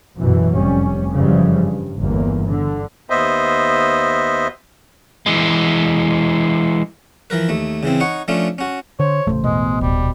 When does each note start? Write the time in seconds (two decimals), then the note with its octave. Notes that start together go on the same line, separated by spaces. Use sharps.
0.18 A1 F#2 B2 E3
0.56 F1 G3 C#4
1.14 F#2 C#3 E3 F3 G3
1.59 G2
1.98 G1 E2 A#3
2.45 D3
3.10 D#2 B3 C5 D#5 E5
5.26 E3 G#3
7.30 E3 F3 A#4 B4
7.49 D#2 A3
7.83 C#3 E3 C4
8.00 D#4 C#5 F#5 C#6
8.28 F3 A3 C#4 D4 F4
8.58 C#4 F#4
9.00 D3 C5 C#5
9.27 A1 D#2 C#3 A3
9.44 E2 B2 G#3 D#5
9.81 D1 A#2 G3